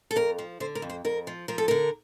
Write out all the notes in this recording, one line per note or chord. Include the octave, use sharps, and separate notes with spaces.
A4
F2 A#4
F3
D3 C5
A#4
F2
C5
F2 A#4
F3
F3 A#4
A4
D3 A#4